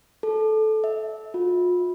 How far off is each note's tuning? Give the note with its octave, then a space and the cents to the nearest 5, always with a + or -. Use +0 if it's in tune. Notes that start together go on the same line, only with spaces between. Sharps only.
A4 -15
E5 -20
F4 +40